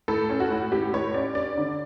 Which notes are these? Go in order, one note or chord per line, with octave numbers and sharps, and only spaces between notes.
A2 A4
C#4
F#4
A2
A2 G4
A2 C#5
C#4 D5
D4 D5
D3